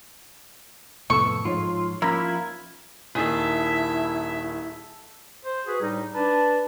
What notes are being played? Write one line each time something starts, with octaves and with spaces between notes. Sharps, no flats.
F2 A2 C3 B3 A4 C#6 E6
G#2 F3 D#4 F4 C#5 C6
F3 A#3 C#4 E4 F4 B5
G#6
D#1 D#3 E4 G#4 A4 E5
C5
F#4 G#4 B4
A2 G3 D4 D#4
D4 B4 A5